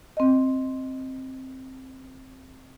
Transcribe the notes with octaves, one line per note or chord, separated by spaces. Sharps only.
C4 D#5